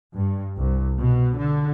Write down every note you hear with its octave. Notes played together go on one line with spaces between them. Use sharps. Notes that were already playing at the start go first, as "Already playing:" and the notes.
G2
C2
B2
D3